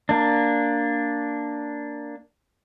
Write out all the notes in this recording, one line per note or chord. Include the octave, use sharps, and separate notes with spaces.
A#3 D4